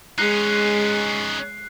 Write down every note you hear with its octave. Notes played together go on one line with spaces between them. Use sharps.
G#3 C#4 D#4 F#6 C7